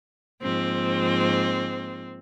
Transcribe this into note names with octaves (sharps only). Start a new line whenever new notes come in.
G#2 F3 A#3 C4